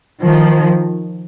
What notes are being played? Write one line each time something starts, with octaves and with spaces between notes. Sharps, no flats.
D#3 F3